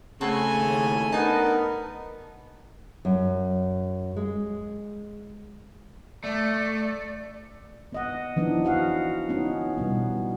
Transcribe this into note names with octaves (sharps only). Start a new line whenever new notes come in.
C#3 A3 C4 F#4 A4 G#5
A1 D#2 A2
B3 D4 D#4 A#4 D#5 A5
F#2
G#3
A3 D5
B3 D#5 F#5
E3 F3 B3 D4 D#4
F#4 F5 F#5
B3 C#4 D#4
B2 G3 B3